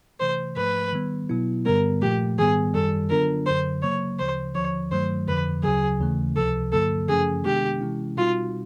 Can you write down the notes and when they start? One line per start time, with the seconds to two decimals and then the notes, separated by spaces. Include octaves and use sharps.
0.20 C3 E3 A3 C5
0.57 G#2 F3 A3 B4
0.93 D#3 G3 B3
1.29 B2 F#3 B3 E4
1.66 G2 D3 G3 B3 A#4
2.02 A#2 F3 A3 G4
2.38 G#2 D#3 G3 B3 G#4
2.74 F#2 D#3 G3 A4
3.10 D3 F#3 B3 D4 F4 A#4
3.46 F#2 D3 F#3 C5
3.82 C#3 F#3 A#3 C#5
4.19 D2 C#3 F3 C5
4.55 D#2 D3 F3 C#5
4.92 G2 D#3 F#3 A3 C5
5.27 F2 D3 F3 B4
5.64 D2 C#3 F#3 G#4
6.00 D#2 C#3 E3 A3
6.36 C#2 C3 F3 A4
6.72 G2 D3 F#3 A#3 A4
7.09 F#2 C#3 F3 A3 C#4 G#4
7.45 C3 D#3 G#3 B3 D4 G4
7.81 C3 E3 G#3 C#4 E4
8.17 B2 G3 C4 D#4 F4 F#4